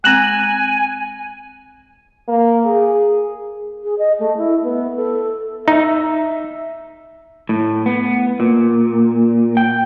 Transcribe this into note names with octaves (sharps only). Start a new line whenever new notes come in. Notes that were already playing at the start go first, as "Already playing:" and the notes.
G#3 C4 G#5 F#6 E7 F#7
A#3
G#4
G#4
D#5
A3
E4
B3
A4
D#4 E5
A2
B3
A#2
G5